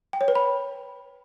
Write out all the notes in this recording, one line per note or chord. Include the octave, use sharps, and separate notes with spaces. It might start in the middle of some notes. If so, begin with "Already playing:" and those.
G5
C#5
B4
B5